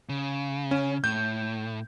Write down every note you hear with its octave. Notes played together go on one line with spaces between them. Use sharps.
C#3
C#4
A2 G6